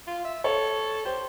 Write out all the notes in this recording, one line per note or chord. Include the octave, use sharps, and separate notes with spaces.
F4
E5
A4 C#5
G4 C5